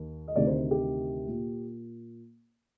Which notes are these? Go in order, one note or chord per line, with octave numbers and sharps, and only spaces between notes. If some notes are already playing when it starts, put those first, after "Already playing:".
Already playing: D#2 D#3
D#5
D2 C3 D#3 D5
C5
G4
A#2